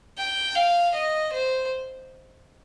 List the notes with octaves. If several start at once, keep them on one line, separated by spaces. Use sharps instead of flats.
G5
F5
D#5
C5